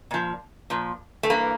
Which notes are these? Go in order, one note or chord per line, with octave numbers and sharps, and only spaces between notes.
A#2 F3
A#2 F3
A3
G2 E3 A#3